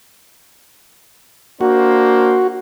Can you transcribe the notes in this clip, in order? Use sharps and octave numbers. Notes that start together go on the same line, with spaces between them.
A#3 D4 F#4 C5